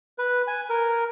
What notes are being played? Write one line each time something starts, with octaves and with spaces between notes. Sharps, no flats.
B4
G#5
A#4